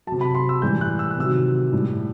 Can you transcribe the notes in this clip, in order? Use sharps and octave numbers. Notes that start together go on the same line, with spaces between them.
C3 F#3 A5
B5
C6
E6
A2 E3 G3 G6
F#6
E6
F#6
C3 D#3 F#3 E6
A2 G3